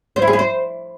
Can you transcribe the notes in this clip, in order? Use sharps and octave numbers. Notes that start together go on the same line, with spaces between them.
C5
E4
G#4
E4
C5